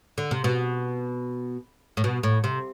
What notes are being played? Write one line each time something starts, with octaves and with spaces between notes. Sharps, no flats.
D3
C3
B2
A2
B2
A2
C3